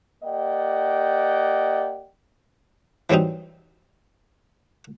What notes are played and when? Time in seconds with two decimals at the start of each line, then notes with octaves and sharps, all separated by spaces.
0.23 A#3 G4 D5 D#5 F#5 G5
3.10 E3 F#3 G3 C4 D#4